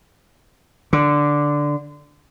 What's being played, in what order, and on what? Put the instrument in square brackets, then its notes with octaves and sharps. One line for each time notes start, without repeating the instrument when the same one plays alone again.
[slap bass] D3